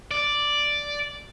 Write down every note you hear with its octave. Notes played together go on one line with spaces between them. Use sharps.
D5